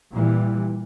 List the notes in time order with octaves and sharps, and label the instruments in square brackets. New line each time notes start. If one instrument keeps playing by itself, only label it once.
[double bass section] A#2 E3 G3